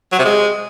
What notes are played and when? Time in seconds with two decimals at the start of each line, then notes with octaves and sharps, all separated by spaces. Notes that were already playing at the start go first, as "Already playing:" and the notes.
0.12 F#3
0.19 C3
0.25 G#3